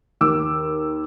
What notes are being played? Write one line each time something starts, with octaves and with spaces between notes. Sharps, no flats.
D#2 D6 E6